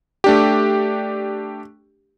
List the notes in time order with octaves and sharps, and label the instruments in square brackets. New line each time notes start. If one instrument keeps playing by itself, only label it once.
[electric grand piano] A3 D4 G4